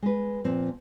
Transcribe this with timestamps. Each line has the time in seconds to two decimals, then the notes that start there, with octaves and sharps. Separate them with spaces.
0.02 G#3 B4
0.44 A#2 F3 C4